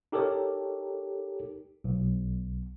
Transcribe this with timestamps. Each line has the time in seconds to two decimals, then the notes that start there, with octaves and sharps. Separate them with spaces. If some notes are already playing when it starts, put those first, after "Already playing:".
0.12 D#4 G4 A4 A#4 C#5
1.84 B1